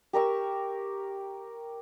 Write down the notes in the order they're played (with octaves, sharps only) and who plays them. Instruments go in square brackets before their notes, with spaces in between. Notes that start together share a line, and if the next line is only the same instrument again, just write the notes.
[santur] G4 A#4 C#6 E6